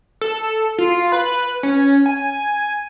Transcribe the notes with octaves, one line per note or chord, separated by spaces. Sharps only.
A4
F4
B4
C#4
G#5